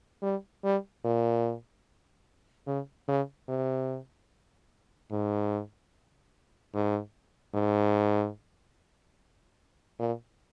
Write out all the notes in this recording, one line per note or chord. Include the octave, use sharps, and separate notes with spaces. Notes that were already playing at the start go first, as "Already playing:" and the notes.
G3
G3
A#2
C#3
C#3
C3
G#2
G#2
G#2
A#2